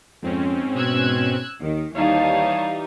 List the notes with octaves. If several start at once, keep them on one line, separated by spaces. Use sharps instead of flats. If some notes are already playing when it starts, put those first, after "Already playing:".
F2 G#2 C4 C#4
B2 E6 F#6 G#6
D#2 D#3
D#2 E3 G3 D#4 C#5 F5 A5